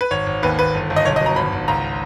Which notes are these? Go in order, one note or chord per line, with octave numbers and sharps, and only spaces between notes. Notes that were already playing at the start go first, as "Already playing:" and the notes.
B4
G#1 C#5
G#1
D#2 B4
D#2 B4
G1
G1
D#5
B1 C#5
D#5
B2 A#5
G#1 B5
G#1
C#2 A#5